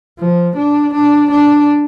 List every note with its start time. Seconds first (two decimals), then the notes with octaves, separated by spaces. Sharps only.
0.19 F3
0.57 D4
0.94 D4
1.31 D4